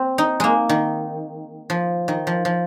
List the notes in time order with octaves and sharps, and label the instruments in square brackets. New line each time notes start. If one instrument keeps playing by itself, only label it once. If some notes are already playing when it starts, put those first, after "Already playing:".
Already playing: [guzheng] C4
D#4
G#3 A#3
D#3
F3
D#3
F3
F3